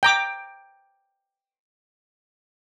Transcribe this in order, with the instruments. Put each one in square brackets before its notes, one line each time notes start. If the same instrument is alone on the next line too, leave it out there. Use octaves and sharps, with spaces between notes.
[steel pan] G5 A#5 D6